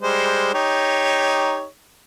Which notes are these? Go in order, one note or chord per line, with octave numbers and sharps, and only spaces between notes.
G3 G#3 C5
D#4 G4 C#5